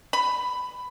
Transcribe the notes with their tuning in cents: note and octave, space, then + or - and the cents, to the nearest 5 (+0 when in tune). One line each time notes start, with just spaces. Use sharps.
B5 +10